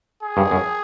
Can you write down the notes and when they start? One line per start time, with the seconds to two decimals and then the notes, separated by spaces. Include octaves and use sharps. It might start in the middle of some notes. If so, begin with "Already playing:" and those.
0.22 G#4
0.37 G2
0.51 F#2